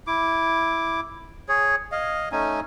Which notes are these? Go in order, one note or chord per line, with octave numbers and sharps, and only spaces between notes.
E4 D6
G#4 C#5
D#5 F5
A3 C#4 D#4 G#5